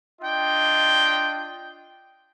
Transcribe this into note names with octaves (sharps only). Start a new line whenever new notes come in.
D4 F4 D#5 G5